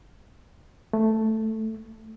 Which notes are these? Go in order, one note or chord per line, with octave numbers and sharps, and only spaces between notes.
A3